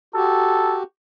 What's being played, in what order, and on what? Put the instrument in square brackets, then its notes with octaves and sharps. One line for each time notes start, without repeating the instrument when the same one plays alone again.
[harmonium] F#4 G4 [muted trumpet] A4